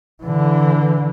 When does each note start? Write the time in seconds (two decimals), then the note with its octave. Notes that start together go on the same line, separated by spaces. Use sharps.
0.23 D3 E3